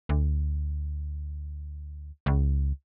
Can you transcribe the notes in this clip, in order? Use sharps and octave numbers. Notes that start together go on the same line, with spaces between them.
D2
C#2